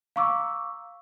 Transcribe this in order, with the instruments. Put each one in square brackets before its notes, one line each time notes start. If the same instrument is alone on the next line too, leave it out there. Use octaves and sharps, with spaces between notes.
[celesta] F5 A#5 C#6 D6 E6